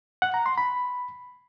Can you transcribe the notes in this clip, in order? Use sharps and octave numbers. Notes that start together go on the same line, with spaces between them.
F#5
A#5
C6
B5